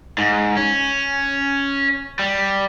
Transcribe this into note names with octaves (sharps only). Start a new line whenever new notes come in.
G#2
C#4
G3